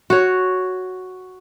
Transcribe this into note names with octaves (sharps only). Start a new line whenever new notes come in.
F#4 C#5